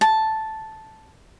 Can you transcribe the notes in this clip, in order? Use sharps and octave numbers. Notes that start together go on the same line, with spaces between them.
A5